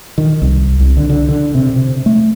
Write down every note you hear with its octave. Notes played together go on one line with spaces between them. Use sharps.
D#3
C2
C2
D3
D3
D3
C3
C3
A3